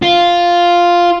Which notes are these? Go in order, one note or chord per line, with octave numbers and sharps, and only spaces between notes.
F4